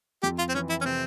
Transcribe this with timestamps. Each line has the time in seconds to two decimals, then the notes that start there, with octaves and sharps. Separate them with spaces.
0.23 F2 G4
0.39 F4
0.49 C4
0.54 E3 C#4
0.70 E4
0.81 C#4
0.85 C3 C4